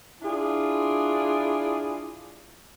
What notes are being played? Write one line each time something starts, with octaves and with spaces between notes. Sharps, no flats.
D4 E4 F4 G#4 D5